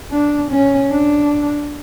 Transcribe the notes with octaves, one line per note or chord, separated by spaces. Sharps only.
D4
C#4
D4